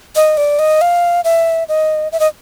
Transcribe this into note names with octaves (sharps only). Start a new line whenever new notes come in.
D#5
D5
D#5
F5
E5
D#5
E5
D#5